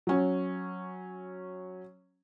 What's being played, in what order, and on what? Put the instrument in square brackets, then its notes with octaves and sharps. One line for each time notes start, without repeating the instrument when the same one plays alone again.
[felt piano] F#3 C#4